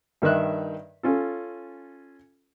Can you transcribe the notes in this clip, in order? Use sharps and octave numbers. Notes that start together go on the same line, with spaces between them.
G2 D#3 D#4 E5 F#6
C#4 F4 A4